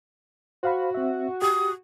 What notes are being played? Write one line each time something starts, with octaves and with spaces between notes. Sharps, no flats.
F#4 C5 F5 B5
C4 E5
G4 D#6